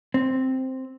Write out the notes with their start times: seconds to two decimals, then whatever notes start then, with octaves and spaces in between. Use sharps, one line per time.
0.14 C4